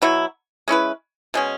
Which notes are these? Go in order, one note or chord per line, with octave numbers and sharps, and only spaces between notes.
B2 F#3 E4
G#3 C#4 E4 B4
B2 G#3 C#4